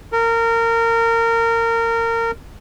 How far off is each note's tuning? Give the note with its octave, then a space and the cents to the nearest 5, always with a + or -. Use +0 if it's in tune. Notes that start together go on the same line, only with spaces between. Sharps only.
A#4 -25